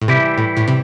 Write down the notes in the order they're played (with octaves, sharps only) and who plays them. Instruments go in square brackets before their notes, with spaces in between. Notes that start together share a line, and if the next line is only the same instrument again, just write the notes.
[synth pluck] A2
[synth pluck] C3 [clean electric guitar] E3 G3 E4 G4
[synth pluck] A2
A2
C3